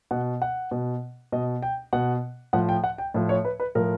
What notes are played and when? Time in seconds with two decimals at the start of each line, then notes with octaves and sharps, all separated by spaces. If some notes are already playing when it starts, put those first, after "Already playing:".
0.11 B2 F#5
0.42 F#5
0.71 B2
1.32 B2 D#5
1.62 G5
1.93 B2 F#5
2.53 A2 F3 F#5
2.69 G5
2.84 F#5
2.98 G5
3.14 A2 F3
3.29 C#5
3.45 B4
3.60 B4
3.75 A2 F3 A#4